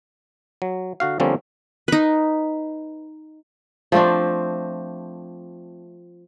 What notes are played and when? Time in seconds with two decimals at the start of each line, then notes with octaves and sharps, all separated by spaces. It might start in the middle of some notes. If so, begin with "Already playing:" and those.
0.62 F#3
1.00 D3 F#4 F5
1.20 D3 F3 G3 A#3 C4 C#4
1.88 D#4 B4
3.92 F3 A3 C4 D4